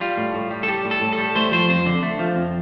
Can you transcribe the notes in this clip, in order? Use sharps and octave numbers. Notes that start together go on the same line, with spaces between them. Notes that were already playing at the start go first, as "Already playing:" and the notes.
G3 F4
A2
A2
G3
A4
G3 G4
A2
A4
A2
A4
G3
A3 C5
F3 C5
F2 C5
D3
A3
F3
F2